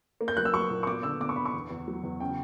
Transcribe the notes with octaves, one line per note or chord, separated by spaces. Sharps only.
A#3
G6
F#3 F#6
E6
F#3 C#6
A#2
C#6
B3 D6
D3 E6
B3 D6
C#6
D3 B5
C#6
E2
E2
F#3
E2
C#3 G5